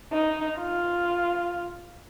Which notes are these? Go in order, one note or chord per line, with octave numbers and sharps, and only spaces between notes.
D#4
F4